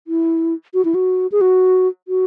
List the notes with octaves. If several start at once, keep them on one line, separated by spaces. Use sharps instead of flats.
E4
F#4
E4
F#4
G#4
F#4
F#4